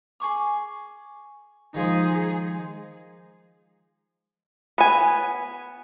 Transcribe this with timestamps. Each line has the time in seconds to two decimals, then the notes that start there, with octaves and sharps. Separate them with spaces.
0.20 G#4 G#5 C#6 D6
1.74 D#3 F3 G#3 D#4 G#4
4.78 B3 G#5